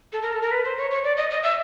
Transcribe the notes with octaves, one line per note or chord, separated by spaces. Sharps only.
A4
A#4
A4
A#4
B4
C5
C#5
C#5
D5
D#5
D#5
E5